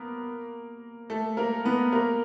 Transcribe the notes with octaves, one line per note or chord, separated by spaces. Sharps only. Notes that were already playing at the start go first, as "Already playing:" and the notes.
Already playing: A#3 B3 A#4
A3 A4
A#3 A#4
B3 B4
A#3 A#4